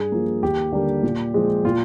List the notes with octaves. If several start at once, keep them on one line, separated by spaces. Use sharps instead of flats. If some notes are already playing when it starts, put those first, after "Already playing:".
Already playing: G2 G#4
F3 A#3
D#2 G4
D3 G3 A#3
A#2
F3 G#3
A#2 F4